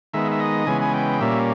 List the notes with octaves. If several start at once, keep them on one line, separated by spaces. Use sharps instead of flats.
D#3 G#3 B3 E5
E5
D#5
C#3 E3 G#3 B3 G#5
G#5
G5
A#2 G3 A#3 C#4 E5